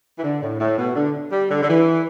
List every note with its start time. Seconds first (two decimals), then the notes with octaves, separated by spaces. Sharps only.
0.18 E3
0.23 D3
0.42 A2
0.59 A2
0.78 B2
0.95 D3
1.32 G3
1.50 D3
1.63 D3
1.69 E3